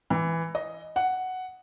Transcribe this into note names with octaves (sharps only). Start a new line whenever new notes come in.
E3
D#5
F#5